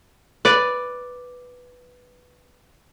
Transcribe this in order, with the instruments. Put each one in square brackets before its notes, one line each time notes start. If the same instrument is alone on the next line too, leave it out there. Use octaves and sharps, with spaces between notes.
[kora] B4 D5